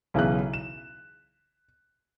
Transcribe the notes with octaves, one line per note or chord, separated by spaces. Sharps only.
B1 C#3 E3 E4 G#4 F#6
E7